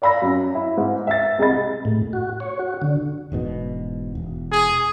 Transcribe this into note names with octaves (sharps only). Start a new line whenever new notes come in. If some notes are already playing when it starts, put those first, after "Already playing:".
D5 F5 B5 E6 A#6
F#2
E4
G#2
E5 E6 A6
C2 G#3 G#4 D#5 B5 A6
A2
F#4
C#5
F#4
D3
E1 G#2 B2
E1
G#4